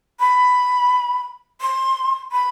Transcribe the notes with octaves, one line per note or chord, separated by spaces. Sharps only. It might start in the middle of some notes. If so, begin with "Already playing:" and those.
B5
C6
B5